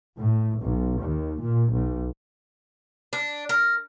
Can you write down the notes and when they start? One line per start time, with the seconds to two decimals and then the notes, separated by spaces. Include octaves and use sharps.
0.19 A2
0.61 B1
1.02 D#2
1.42 A#2
1.74 B1
3.13 D4
3.49 A#4